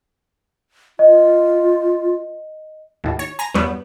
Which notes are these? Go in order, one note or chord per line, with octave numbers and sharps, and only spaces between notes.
F4 D#5
D#2 A2
C#5
G#5 A#5 A#6
E2 G2 F#3 G3 B3